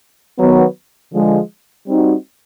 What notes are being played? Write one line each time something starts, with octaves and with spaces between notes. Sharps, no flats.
D#3 F#3 B3
D3 F3 G#3
G3 C4 D#4 F#4